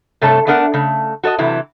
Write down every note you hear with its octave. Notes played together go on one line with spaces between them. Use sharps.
G2 C3 A3 A4 C#5 A5
A3 B3 D4 A#4 F5 F#5
C#3 A3
F#4 A4 C#5 D#5
C3 E3 F#3 E4